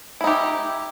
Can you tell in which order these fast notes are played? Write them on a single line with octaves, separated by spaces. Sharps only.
E4 D#4 G4